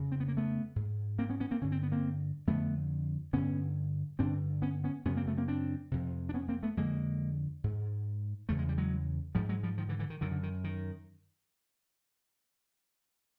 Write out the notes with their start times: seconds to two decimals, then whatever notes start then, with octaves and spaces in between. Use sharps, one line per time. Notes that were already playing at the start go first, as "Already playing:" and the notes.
Already playing: F2 C#3
0.12 C4
0.20 B3
0.28 A#3
0.37 A3 B3
0.76 G#2
1.19 A#3 C4
1.29 B3 C#4
1.40 B3 C#4
1.51 A#3 C4
1.62 G2 D3 C#4
1.72 C4
1.83 B3
1.92 A#3 C4
2.47 F2 D3 A3 B3
3.33 G2 D3 B3 C#4
4.19 G2 D3 C4 D4
4.62 B3 C#4
4.84 B3 C#4
5.05 F#2 C#3 B3 C#4
5.17 A#3 C4
5.27 A3 B3
5.37 A#3 C4
5.48 C4 D4
5.91 F2 C3
6.29 D4
6.34 B3 C#4
6.49 A#3 C4
6.63 A3 B3
6.77 F2 D3 G#3 A#3
7.64 G#2
8.49 E2 C#3 A3
8.59 G#3
8.69 G3
8.78 F#3 G#3
9.35 G#2 F3 G3
9.49 F#3 G#3
9.63 F3 G3
9.78 D#3 F3
9.89 D3 E3
9.99 D3 E3
10.10 D#3
10.21 F#2 D3 D#3
10.31 D3
10.43 D#3
10.64 D#3